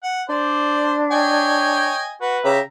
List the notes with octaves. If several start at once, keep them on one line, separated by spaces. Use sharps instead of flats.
F#5
D4 C5 D5
C#5 D#5 G5 G#5
F#4 B4
C#3 G4 E5 A#5